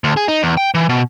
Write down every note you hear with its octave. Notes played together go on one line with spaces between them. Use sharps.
D2
G#4
D#4
E2
G5
E3
B2